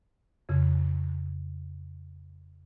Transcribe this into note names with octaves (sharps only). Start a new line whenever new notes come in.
F2 C#3